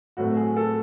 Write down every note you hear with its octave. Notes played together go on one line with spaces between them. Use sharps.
A2 F#3 A3 C4 F#4
G#4
A4